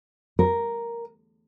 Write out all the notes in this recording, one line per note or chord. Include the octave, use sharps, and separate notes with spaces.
A#4